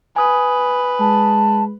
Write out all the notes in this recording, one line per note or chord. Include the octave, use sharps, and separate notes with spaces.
B4 G#5 D#6
G#3 A5